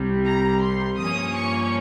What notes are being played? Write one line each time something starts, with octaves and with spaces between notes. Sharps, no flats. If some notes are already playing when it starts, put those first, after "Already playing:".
Already playing: C2 C3 G3
A#5
C6
G2 F3 A#3 C#4 D#6
C#6